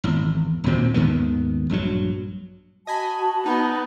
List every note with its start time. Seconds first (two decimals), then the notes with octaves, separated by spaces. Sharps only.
0.04 G#1 E2
0.64 D#1 D2 A#2 C4
0.94 D#2 G#2 D#3 B3
1.70 A#1 G2 D#3 F#3
2.87 F#4 D#5 G#5 A5 B5
3.46 B3 D#4